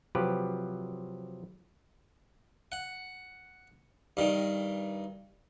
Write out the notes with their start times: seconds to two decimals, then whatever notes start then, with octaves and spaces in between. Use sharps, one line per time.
0.15 C3 F3 F#3 F4 G4 B4
2.72 F#5
4.17 G2 D#3